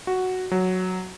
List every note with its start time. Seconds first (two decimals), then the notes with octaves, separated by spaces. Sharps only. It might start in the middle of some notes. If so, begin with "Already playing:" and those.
0.07 F#4
0.51 F#3